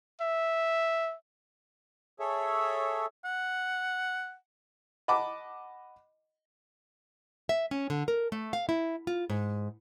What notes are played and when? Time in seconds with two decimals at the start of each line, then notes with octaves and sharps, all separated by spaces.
0.21 E5
2.20 G#4 A4 C#5 E5
3.25 F#5
5.08 D#5 F#5 A5 B5 D6
7.49 E5
7.71 C#4
7.90 D3
8.08 A#4
8.32 A3
8.53 F5
8.69 E4
9.07 F4
9.30 G#2